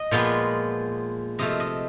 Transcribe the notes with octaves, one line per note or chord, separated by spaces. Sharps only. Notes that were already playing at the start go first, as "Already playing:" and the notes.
Already playing: D#5
A#2 F3 G#3 B3
C3 F3 A3 D#5
D#5